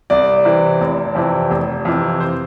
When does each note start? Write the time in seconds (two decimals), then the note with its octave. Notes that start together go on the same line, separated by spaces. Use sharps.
0.10 C2 D5
0.45 C3 E3
0.81 F1
1.15 F2 C3 E3
1.51 F1
1.85 F2 C3 E3
2.20 C5